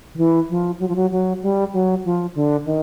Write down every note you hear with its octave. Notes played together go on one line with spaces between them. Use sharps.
D#3
E3
F3
F#3
F3
F#3
F#3
G3
F#3
F3
D3
D#3